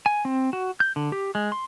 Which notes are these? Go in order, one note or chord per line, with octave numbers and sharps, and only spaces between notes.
G#5
C4
F#4
G6
D3
G4
G#3
C6